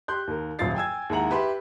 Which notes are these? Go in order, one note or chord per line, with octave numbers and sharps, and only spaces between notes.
G4 C6 F#6 G6
D#2 A#4
D#1 F#2 F4 A6 C7
G5 G#5 E6 G#6
D#2 G#3 E4 F#5 A#5 F#7
G4 B4 E5 B5 C6